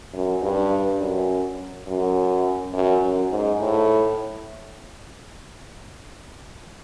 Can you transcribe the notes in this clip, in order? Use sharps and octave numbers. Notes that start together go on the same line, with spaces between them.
F#2
G2
F#2
F#2
F#2
F#2
G#2
A2